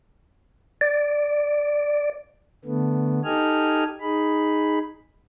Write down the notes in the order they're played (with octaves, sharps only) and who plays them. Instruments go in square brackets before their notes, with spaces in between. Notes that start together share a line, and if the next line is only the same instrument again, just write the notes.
[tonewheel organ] D5
[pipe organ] D3 A3 B3
D#4 G4 A4 D#5 G#5 F6
D#4 G#4 B5